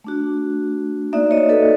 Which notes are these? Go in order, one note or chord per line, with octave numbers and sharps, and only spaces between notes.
A3 D4 F#4
A#3 D#4 F#4 D5 E5
C#5 D#5
A4 B4